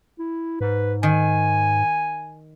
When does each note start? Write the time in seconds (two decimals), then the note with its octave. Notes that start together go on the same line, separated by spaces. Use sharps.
0.19 E4
0.61 G#2 B4
1.03 D#3 G#5